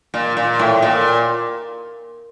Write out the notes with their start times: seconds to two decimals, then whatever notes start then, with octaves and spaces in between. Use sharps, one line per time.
0.14 A#2
0.37 A#2
0.59 A2
0.82 A#2